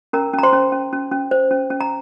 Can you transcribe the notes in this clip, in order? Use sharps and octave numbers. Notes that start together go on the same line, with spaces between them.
C#4 A#4 A#5
C#4
A#5
C5 C6
C#4
C#4
C#4
C#4
C5
C#4
C#4
A#5